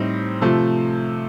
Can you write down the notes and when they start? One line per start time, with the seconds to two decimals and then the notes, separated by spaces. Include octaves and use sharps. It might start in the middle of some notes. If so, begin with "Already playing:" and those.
Already playing: A2 G3 C4 D#4
0.42 C3 F3 A3